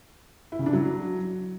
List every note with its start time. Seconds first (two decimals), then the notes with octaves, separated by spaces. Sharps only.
0.52 E4
0.59 C#3
0.66 D4
0.73 F#3